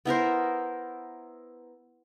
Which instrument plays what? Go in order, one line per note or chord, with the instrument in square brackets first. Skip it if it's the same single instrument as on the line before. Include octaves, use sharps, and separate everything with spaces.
[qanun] B3 E4 A#4 C5